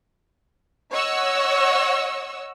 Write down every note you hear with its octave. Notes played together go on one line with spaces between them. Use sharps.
C#5 D#5 F#5 C#6 E6